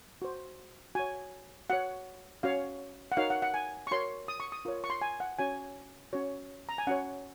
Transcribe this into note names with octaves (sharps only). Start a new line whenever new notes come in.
F#4 C5
F#4 C#5 G#5
F#4 C#5 F#5
C#4 F#4 C#5 F5
F#5
D#4 F#4 A#4 C#5 F5
F#5
F#5
G#5
C#6
F#4 A#4 C#5 C6
D#6
C#6
D#6
F4 A#4 C#5
C#6
C6
G#5
F#5
C#4 F#4 C#5 G#5
C#4 F#4 C#5
A#5
G#5
C#4 F#4 C#5 F#5